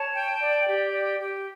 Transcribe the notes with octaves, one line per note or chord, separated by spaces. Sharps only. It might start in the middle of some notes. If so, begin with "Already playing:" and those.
Already playing: C#5 A5
G5
D5
G4
D5
G4